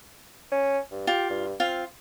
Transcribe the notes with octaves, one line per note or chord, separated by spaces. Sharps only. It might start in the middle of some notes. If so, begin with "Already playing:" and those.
C#4
G2
F4 G4
G2
C4 F4 F5